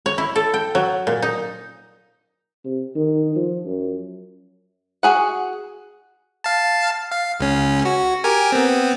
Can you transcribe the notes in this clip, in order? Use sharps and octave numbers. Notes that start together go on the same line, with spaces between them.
C#5
E4
A4
G5
F#3
A#2
D#4
C3
D#3
F3
F#2
F#4 G#4 F#5
F5 A5
F5
C#2 C#4
F#4
G4 A#4 G#5
B3 C4